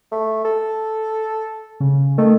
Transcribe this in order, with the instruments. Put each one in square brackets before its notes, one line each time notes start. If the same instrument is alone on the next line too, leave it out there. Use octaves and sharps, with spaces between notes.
[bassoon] A3
A4
[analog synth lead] C#3
[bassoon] D#3 [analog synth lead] A3